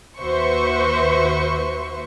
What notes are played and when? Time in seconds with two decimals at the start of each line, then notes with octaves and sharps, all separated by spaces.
0.19 D#2 F#4 B4 C5 E5 C#6